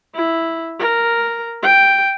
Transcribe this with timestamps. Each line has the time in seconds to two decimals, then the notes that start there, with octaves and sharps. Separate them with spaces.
0.15 E4
0.79 A#4
1.63 G5